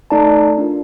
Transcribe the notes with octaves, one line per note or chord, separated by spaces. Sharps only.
A3 D#4 A4 D5 A5
D4 F4 A#4